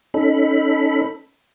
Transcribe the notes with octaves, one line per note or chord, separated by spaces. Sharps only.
C#4 D#4 A4 B5